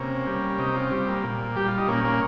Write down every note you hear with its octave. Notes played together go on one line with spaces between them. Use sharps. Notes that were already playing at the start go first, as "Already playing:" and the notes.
Already playing: C3 A#3 C#4
G3
C3 D#4 G4
C#4 F4
G3 C4
A#3
A#2
G3 G4
F4
D#4
A#2 A#3 C#4
A#3 C#4